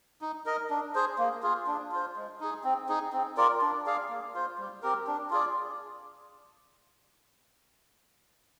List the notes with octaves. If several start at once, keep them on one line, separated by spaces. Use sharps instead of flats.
D#4
A#4 D#5
D4
G#4 C5
A#3
F4 G#4
D4
F4 C5
G#3
D#4 G#4
C4
D#4 G#4
C4
F4 A#4 D5
D4
G#4 D5 F5
A#3
F4 C5
G3
C4 G4 A#4
D4
F4 G#4 D5